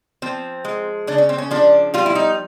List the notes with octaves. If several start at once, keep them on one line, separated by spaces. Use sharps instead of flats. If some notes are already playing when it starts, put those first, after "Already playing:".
F3 C4
G#3
C#3 D4
C#4
C4
C#4
F3 D4
G3 F4
E4
D#4